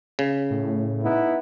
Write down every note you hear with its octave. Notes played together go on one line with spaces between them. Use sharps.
C#3
A2
B3 D#4 E4